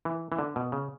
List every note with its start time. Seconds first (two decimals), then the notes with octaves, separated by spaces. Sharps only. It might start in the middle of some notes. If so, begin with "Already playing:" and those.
0.05 E3
0.32 E3
0.39 D3
0.56 B2
0.72 C#3